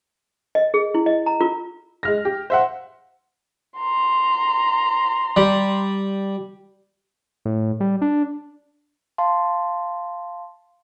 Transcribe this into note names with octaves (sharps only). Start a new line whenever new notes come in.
D#5
G#4
E4
D#5
A#5
F4
G#3 F6 A#6
G4
C5 E5 F#5
A#5 C6
G3
A2
G3
D4
F5 A5 C6